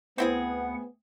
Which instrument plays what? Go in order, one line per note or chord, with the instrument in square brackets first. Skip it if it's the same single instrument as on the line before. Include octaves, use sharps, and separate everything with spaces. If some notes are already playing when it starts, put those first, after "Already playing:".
[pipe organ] D2 F#5 [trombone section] B3 [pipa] C4 E4 G#4